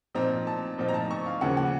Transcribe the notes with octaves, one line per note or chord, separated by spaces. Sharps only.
A#2 F3 C4 D#4 A#5
A5
A#2 F3 C4 D#4
A#5
A5
C#6
F5
D#2 C#3 F3 A#3 F#5
F#5